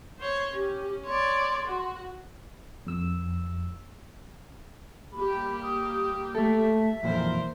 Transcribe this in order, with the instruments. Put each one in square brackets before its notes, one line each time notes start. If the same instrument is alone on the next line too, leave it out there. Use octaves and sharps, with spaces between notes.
[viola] C5 C#5
[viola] C#4 [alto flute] G4
[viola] C#5 D5 [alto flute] C6
[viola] F#4
[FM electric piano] F2 E6
[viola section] G3 A#3 G4 [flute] B5
[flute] D#6
[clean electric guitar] A3 A4 [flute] E5
[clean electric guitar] F2 A#2 E3 [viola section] A#4 C5